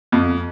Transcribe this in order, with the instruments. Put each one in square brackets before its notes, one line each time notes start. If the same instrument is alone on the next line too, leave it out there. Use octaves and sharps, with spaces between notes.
[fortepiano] F2